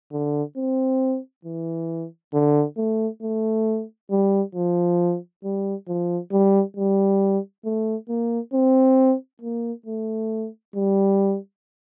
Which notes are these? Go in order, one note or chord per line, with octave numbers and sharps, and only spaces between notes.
D3
C4
E3
D3
A3
A3
G3
F3
G3
F3
G3
G3
A3
A#3
C4
A#3
A3
G3